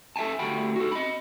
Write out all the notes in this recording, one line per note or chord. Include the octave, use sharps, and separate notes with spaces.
A4 E5 F5 G#5 A5
D2 G3 A3 F#4 G5 B5
F#4 A4
D#5 B5